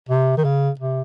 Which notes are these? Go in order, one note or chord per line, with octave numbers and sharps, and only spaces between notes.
C3
D#3
C#3
C3